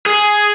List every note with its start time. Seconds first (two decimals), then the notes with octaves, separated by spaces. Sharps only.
0.06 G#4